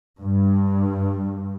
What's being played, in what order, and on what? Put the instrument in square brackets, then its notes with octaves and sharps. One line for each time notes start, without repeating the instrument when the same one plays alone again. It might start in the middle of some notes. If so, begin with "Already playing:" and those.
[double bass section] G2